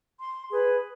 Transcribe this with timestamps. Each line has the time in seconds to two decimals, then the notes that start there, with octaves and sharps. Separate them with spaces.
0.20 C6
0.50 G#4 B4